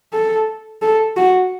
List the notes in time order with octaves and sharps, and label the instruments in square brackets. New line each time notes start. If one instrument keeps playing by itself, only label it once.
[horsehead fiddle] A4
A4
F#4